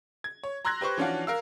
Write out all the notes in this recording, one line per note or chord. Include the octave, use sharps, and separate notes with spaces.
G#6
C#5
A#5 C6 E6 F#6 G#6 A#6
G4 B4 C5 C#6
E3 F3 C#4 D4 F4 F#4
A#4 F5 E6